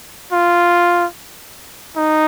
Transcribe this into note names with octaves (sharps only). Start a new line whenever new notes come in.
F4
D#4